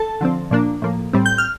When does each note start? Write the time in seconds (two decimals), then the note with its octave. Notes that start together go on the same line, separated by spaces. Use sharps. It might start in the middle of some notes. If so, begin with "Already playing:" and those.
Already playing: A4 A5
0.21 D3 F3 C4
0.51 A#2 F3 A#3 D4
0.82 A2 F3 A#3
1.13 A2 G3 C4
1.26 G6
1.38 F6